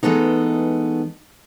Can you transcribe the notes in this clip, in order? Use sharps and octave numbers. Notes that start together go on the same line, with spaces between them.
E3 G#3 A3 B3 D#4